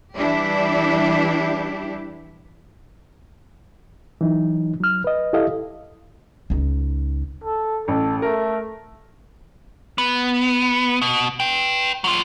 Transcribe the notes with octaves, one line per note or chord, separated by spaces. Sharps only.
E3 G3 D4 E4 G4
E3 F#3 D#4
F#3 F6
B4 D#5
E4 G4 A4 D#5 F5
C#2 D#4
A4
A1 A4
A3 A#4
B3
B2
B4 G5
F#3 F4